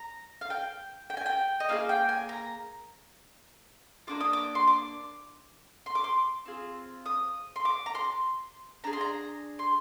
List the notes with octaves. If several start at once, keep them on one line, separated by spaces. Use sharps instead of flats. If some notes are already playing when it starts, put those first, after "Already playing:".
Already playing: A#5
F5
G5
G5
G#5
G5
D#5
A#3 F4 G#4 F5
G5
G#5
A#5
A#3 D4 F4 D6
D#6
D6
C6
D6
C6
D6
C6
C4 F4 G#4
D#6
C6
D6
A#5
C6
D4 G#4 A#5
C6
A#5
C6